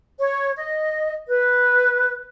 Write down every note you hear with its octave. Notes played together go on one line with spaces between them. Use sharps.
C#5
D#5
B4